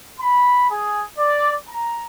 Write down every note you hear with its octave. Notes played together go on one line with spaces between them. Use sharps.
B5
G#4
D5
A#5